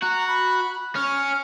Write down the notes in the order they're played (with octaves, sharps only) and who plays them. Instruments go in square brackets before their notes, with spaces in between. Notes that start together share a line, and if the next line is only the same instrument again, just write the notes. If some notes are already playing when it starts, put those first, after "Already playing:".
[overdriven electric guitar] F#4 [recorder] A#5
[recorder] B5
[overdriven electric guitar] C#4 [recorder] F6